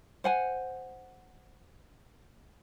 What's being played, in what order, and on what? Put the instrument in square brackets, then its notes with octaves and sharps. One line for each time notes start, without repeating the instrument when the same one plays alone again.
[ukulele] C5 F#5 G#5